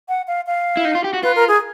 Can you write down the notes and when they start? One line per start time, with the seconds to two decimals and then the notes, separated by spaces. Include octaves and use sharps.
0.09 F#5
0.28 F5
0.47 F5
0.77 E4
0.85 D#4
0.95 F4
1.04 G4
1.13 F#4
1.23 F4 B4
1.35 A#4
1.48 G#4